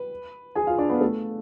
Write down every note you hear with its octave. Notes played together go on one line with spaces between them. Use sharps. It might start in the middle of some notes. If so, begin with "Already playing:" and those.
Already playing: B4
G#4 G#5
F4 F5
D4 D5
B3 B4
A3 A4